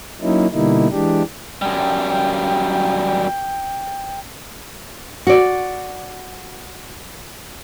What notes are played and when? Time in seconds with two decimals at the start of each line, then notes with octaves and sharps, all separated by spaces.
0.21 F#3 A#3 C#4 D#4 E4
0.52 B2 D3 G3 A#3 D#4 E4
0.90 E3 G#3 D4 G4
1.62 F#2 G3 G5
5.27 F#4 D5